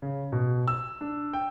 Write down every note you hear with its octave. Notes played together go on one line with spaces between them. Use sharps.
C#3
B2
E6
D4
G5